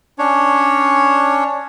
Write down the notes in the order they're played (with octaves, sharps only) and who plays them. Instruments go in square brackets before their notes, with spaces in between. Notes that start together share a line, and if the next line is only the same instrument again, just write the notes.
[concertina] C#4 D4 C#5